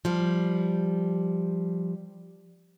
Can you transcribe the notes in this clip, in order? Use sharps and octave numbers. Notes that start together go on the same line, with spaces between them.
F3 G3